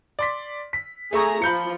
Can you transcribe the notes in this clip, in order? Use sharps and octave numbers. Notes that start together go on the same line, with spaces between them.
D5 C6 B6
B6
A3 G#4 E5 A#5 C#6
F3 B5 G6 C#7